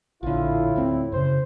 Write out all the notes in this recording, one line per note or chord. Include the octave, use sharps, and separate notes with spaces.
A#1 A2 D3 E4 F4
D2 C4
F#2 C#3 C5